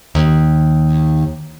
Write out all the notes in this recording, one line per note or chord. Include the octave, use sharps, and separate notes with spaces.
D#2